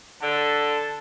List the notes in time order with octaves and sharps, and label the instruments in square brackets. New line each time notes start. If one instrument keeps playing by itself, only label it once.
[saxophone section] D3 [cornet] A5